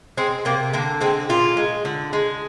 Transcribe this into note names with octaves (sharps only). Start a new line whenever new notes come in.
G#3 C4
C3 A#3
D3 A#3
G#3 C4
A#2 F4
G#3
D3
G#3